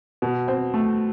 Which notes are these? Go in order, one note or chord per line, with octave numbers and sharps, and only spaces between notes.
B2
C4
A3